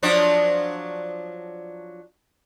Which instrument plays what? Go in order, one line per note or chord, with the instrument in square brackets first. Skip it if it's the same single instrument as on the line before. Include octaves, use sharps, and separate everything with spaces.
[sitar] F3 F#3 D4